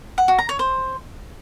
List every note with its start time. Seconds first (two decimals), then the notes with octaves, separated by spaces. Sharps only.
0.18 F#5
0.28 F#4
0.39 A#5
0.49 C#5
0.59 C5